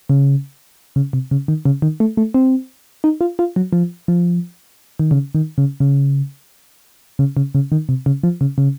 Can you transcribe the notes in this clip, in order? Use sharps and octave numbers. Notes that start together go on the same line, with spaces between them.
C#3
C#3
C3
C#3
D#3
C#3
D#3
A3
A3
C4
D#4
F4
F4
F#3
F3
F3
D#3
C#3
D#3
C#3
C#3
C#3
C#3
C#3
D#3
C3
C#3
F3
C#3
C#3